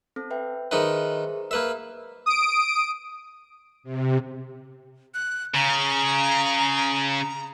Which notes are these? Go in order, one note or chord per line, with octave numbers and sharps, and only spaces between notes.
C4 A4
B4 E5 G5
D#3 D#4 G#4 B4 C5 E5
A#3 A#4 B4 E5
D#6 D7
C3
F#6
C#3 A#5